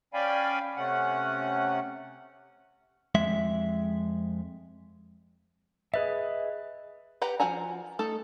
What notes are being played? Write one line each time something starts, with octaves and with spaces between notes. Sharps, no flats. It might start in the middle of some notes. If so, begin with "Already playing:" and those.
C#4 D5 F5 G5 G#5 B5
C3 A3 C#4 F#5
F2 G#3 E5
G#4 B4 D#5 E5
G4 B4 F#5 A#5
F3 F#4 F#5 G#5 A#5
A3 D#4 A4